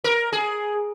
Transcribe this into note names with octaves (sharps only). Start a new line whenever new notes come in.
A#4
G#4